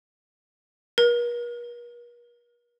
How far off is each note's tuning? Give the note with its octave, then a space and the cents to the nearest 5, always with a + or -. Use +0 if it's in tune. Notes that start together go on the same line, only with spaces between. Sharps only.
A#4 +45